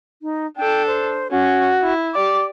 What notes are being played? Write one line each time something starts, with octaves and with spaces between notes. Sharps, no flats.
D#4
D4 A4 G5
C5
C#4 F#4
E4
G4 D5 D6